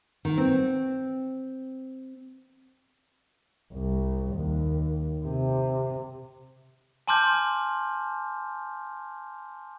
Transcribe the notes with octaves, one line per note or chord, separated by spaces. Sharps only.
D#3
C4
C2
D#2
C3
G#5 A5 C6 D6 F6 G6